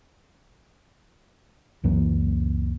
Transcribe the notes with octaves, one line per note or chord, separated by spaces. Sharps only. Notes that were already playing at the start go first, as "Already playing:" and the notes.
C#2 F#2 E3 A#3